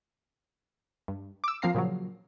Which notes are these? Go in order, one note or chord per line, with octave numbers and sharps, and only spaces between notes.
G2
D6 E6
F3 A#3 C4 F5 A#5 C7
A#2 C#3 F3 F#3